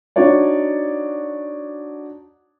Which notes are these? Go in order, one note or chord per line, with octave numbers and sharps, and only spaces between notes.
D4 D#4 F#4 C#5 D5